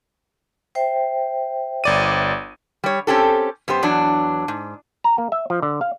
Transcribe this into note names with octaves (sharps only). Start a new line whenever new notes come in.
C5 E5 G5
G1 D5 D#7
G3 C#5
C4 C#4 G4 A4
F#2 B3 G4 C5
E2 F#3 D4
G#2
A#5
A#3
E5
F3
D3
F5